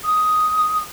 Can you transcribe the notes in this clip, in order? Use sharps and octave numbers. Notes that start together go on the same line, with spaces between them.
D#6